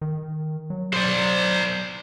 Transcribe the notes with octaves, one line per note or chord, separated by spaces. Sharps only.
D#3
F#3
C5 D5